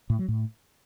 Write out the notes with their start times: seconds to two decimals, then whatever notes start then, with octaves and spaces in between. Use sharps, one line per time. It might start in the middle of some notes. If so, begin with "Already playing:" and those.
0.10 A2
0.19 F#3
0.28 A2